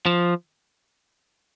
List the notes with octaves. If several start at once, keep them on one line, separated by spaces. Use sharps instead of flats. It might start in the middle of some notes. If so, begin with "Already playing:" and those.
F3